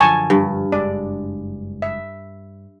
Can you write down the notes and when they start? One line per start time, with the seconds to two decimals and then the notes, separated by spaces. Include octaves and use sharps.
0.01 F#2 D3 F3 G#5 A5 C#6
0.30 G2
0.72 F#1 G#3 D4 D5
1.82 E5